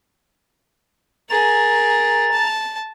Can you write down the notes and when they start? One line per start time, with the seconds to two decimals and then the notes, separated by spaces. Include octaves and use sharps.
1.30 G#4 A#4 A#5 A6
2.31 A5